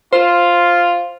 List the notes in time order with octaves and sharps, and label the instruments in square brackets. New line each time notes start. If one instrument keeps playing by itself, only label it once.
[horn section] F4 [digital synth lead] C5